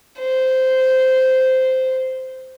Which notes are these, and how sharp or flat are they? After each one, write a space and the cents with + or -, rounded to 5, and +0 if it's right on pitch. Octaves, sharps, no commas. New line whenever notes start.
C5 -10